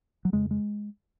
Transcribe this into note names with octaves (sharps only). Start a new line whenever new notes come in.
F#3
F2 C#3 G#3
G#3